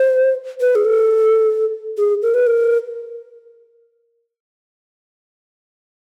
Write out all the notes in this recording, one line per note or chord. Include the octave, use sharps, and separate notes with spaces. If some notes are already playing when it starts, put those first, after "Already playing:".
Already playing: C5
B4
G#4
A4
G#4
A#4
B4
A#4